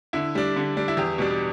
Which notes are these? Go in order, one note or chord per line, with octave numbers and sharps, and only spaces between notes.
D3 E4
G3 D4
D3
G3 D4
E4
E2 G4
B2 G3 D4